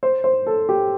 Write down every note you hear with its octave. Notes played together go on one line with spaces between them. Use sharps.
C5
C5
A4
G4